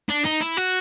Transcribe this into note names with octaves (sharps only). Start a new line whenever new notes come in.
D4
D#4
E4
F#4